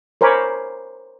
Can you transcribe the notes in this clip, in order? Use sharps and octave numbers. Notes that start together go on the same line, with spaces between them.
A#4 C5 C#5 G#5 B5 D6